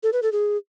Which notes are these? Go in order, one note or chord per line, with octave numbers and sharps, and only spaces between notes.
A4
B4
A4
G#4